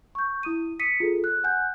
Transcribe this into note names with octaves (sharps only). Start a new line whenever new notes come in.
C#6 G6
E4 D#6 D#7
D#6 B6 C#7 D#7
F4 G#4 A4
F#6
F#5 G#5 F#6 G6